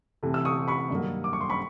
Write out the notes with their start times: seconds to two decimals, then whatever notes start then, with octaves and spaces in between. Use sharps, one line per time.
0.23 C3 E3 A3
0.34 E6
0.45 C#6 D#6
0.68 B5 C#6
0.90 G2 D#3 F#3 A#3
1.24 D6
1.33 C#6
1.41 C6
1.49 B5 C#6